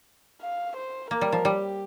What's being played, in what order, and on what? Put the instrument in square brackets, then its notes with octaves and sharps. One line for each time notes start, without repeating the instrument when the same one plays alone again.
[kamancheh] F5
C5
[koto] A#3 [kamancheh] A#4
[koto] G3
F3
[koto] G3 [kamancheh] G4